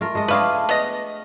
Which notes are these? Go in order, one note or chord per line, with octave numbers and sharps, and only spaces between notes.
A3 F4 A#4
G#3 A4 D#5
A3 D4 G#4 B4 F5
B3 D#5